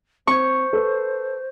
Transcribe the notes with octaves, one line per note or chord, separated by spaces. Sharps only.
C4 C5 C#6 G#6
A4 B4